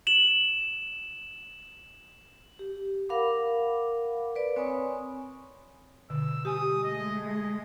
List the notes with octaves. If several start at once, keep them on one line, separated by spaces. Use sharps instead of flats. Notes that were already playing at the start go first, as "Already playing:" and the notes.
E7 F#7
G4
A#4 F5 F#5 B5 D6
B4 D5
C4 C#5 G#5 B5 C#6 D#6
B2 D3 E6
G3 G4 G#5 D#6
G#3 A3 D#5
D#5